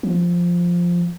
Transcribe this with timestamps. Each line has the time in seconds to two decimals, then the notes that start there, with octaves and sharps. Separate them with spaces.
0.03 F3